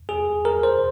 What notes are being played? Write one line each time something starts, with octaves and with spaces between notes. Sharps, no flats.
G#4
A#4
C5